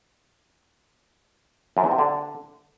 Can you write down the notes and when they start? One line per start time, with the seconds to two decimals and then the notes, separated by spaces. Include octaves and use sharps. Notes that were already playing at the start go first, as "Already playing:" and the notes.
1.77 F#2
1.84 E2
1.91 C3
1.99 D3